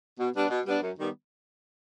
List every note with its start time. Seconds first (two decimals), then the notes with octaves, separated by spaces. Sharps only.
0.18 B2
0.35 G3 B3 D4
0.50 B2
0.67 G3 B3 D4
0.81 F#2
0.98 D#3 G3 B3